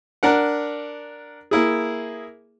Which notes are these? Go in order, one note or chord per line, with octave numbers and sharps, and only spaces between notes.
D4 A#4 F#5
A#3 E4 G#4